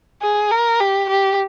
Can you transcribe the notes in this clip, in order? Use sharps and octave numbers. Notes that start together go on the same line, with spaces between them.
G#4
A#4
G4
G4